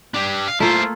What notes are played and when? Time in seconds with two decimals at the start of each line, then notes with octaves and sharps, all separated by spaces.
0.14 D4 G4
0.48 F5
0.60 A3 A#3 E4 F4 C5